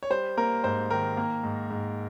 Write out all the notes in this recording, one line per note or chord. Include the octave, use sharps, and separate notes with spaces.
C#5
G3 C5
A#3 A#4
G#2 C5
D#3 A#4
A#3
G#2
G#2